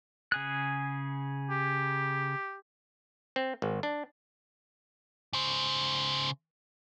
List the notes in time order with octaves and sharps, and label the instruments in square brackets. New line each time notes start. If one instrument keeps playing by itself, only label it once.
[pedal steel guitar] C#3 G#4 F#6
[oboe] G4
[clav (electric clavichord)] C4
G#1
D4
[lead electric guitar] C#3 C5